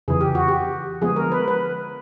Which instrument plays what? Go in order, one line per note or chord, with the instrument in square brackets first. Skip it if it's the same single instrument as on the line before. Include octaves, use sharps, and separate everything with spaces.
[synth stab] F2 C#3 E3 [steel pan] G#4
[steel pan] G4
F#4
G4
[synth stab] D3 F3 G#3 B3 [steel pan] G#4
[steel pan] A#4
B4
B4